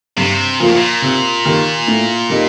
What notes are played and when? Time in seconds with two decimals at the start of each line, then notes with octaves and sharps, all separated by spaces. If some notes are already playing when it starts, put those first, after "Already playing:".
0.17 G2 C3
0.60 A#2 F3 A#3 F4
0.69 A2
0.77 A#2
1.02 C3
1.45 D#3 A#3 D#4 G4
1.87 A2
2.30 G3 A#3 D#4